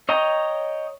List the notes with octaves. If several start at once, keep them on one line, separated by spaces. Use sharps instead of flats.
C#5 D#5 G5 A#5